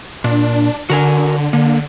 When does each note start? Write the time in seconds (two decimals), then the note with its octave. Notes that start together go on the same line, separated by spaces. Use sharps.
0.24 A#2 D4
0.90 D3 F#4 A#4 G#5
1.53 D3 A#3